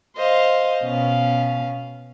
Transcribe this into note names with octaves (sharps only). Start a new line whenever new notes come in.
C5 D#5 F5
B2 C#4 F5